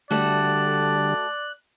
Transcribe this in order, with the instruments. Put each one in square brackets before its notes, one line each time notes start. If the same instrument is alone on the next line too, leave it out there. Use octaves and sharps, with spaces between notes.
[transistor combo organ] D3 G3 [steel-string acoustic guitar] A3 F#4 A4 [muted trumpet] D5 [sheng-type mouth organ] F#6